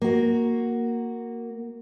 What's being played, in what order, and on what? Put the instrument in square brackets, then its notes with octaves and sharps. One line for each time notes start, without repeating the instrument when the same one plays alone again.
[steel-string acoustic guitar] A#3 F#4